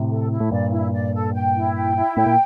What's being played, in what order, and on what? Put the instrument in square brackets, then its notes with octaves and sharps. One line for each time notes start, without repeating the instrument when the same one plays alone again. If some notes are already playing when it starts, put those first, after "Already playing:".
Already playing: [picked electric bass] A2 C3
[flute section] A4
E4
[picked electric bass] A2
[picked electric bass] G2 A#2 [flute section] D5
[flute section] E4
D5
A4
G5
E4
G5
E4
[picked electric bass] A2 [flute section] G5
[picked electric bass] A#2